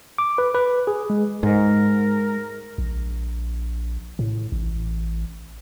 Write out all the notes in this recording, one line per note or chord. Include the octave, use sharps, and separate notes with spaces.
D6
B4
B4
G#4
G#3
G#2 G#3 A#4
A#1
A2
A1